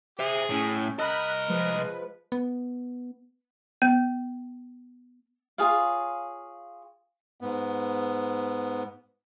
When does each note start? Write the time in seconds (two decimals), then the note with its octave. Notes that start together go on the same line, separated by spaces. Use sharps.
0.19 G#4 C5 E5
0.50 A2 C#4
0.99 C2 A#4 D#5 G5 B5 F#6
1.48 F3 G#3 B4
2.32 B3
3.82 B3
5.58 F4 G#4 C#5 F5
7.41 G#2 B3